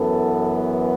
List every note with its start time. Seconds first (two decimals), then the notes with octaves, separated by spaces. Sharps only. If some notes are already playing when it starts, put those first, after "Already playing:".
Already playing: F#2 E3 B3 A4